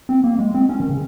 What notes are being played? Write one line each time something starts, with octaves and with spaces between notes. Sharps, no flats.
C4
A#3
G#3
C4
C#4
D#3
C#3